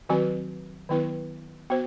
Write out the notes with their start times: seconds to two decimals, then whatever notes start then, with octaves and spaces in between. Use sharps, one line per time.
0.09 D#3 F#3 C4 F#4 B4
0.89 D#3 F#3 B3 E4 B4
1.70 B3 F#4 C5